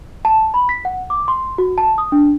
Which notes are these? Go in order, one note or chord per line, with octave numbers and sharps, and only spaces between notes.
A5
B5
B6
F#5
D6
C6
F#4
A5
D#6
D4